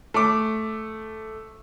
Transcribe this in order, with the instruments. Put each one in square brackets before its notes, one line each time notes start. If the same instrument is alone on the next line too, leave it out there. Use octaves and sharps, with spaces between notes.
[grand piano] A3 D6